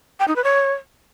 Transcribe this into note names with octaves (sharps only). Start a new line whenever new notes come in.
G5
D#4
B4
C#5